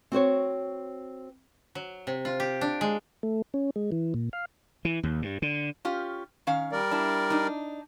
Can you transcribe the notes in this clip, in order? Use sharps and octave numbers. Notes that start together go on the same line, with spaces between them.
C4 F#4 C5 C#5
F#3
C3
F4
G4
D4
G#3
A3
C#4
G#3
E3
A#2
F5
E3
D#2
G2
D3
C#4 F4 G4
D#3 C#4 F5
G3 A#4 D5
D4 E4
D4 D#4